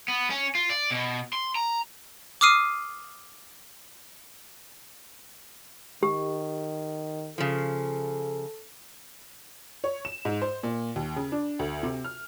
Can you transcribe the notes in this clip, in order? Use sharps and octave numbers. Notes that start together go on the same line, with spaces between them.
B3
C#4
F4
D5
B2
C6
A#5
D6 D#6 F6 C7 D#7
D#3 G4
C#3 F3 A4
C#5
E7
G#2
C5
A#2
D#2
C#3
D4
D2
C3
F6